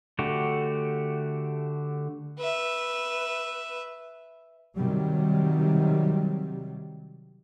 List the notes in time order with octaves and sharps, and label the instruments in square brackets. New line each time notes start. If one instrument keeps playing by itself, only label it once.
[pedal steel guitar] D3 A3 F#4 G4
[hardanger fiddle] B4 E5
[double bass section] C3 D#3 F#3 G3